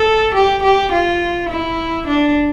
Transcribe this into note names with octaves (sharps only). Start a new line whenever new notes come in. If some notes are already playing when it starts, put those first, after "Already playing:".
Already playing: A4
G4
G4
F4
E4
D4